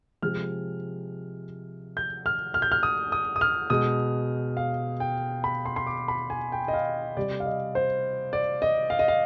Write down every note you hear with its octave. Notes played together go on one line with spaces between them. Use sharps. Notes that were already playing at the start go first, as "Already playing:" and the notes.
C3 F3 G#3 F6
G6
F6
F6
G6
F6
D#6
D#6
D#6
F6
B2 G#3 D#6
F5
G5
B5
C6
C6
D6
B5
G#5
G5
D#5
F5
C3 G3 D5
F5
D#5
C5
D5
D#5
F5
D#5
F5